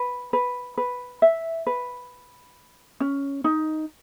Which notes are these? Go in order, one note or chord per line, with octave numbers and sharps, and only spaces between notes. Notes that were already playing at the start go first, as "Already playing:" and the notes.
Already playing: B4
B4
B4
E5
B4
C#4
D#4